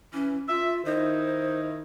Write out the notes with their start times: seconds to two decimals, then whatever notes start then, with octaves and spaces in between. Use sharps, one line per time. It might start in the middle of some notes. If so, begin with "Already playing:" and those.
0.13 E3 C#4
0.48 F4 E5
0.85 D#3 D#4 E4 C5